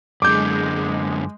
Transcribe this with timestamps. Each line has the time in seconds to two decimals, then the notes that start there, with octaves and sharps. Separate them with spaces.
0.22 F#2 D3 G#3 D6 G6